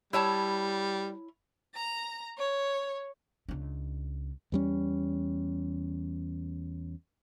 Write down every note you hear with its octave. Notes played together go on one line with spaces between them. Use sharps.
G3 E4 C#5 A5
A#5
C#5
C#2 D4
E2 G3 C#4